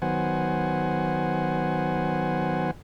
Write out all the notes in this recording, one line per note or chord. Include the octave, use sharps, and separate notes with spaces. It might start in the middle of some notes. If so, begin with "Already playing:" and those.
D#3 F#3 B3 C5 F#5 G#5